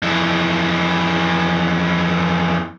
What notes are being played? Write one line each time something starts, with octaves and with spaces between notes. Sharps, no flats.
F2 E3